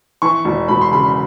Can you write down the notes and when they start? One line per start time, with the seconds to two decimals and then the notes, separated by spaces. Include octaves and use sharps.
0.22 E3 C#6
0.45 E1
0.68 E1 B5
0.81 C6
0.91 C#3 B5